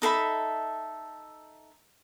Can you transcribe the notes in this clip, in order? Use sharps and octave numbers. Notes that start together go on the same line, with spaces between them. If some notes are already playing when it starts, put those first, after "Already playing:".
D#4 A4 E5 B5